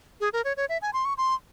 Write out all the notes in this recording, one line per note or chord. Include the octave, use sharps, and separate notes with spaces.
G#4
A#4
C#5
C#5
E5
G#5
C6
C#6
C6